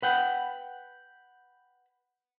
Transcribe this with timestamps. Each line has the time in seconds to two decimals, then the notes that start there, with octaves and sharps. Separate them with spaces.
0.02 B4 F#5 G5